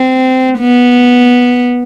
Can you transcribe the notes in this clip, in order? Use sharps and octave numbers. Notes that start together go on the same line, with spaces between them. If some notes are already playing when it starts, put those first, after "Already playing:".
Already playing: C4
B3